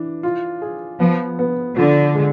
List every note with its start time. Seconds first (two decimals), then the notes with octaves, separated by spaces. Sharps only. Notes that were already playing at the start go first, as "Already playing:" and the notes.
Already playing: E3 D4
0.23 F4
0.62 G#4
0.99 F3 B3
1.39 B3
1.77 D3 F3
2.15 G#3